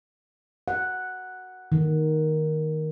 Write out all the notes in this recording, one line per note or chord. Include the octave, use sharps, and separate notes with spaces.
F#5
D#3